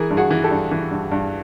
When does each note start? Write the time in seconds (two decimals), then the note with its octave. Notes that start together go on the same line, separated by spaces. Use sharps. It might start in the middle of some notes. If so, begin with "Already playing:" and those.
Already playing: E3 G#4 A#4
0.10 G2
0.17 F#4 G#4
0.30 E3
0.44 G4 A4
0.51 G2
0.71 E3
0.91 G2
1.12 G2